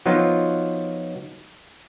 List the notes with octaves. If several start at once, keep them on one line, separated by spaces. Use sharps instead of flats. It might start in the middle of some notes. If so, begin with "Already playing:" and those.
F3 F#3 B3 D#4 F4